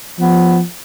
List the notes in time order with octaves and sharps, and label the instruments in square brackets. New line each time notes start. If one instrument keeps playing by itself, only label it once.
[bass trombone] F3 [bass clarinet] B3